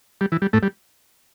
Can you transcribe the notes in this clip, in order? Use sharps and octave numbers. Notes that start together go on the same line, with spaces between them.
G3
E3
G3
A2 A3
G3